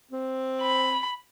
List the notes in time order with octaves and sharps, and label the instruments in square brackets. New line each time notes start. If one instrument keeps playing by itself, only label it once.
[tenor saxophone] C4
[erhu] B5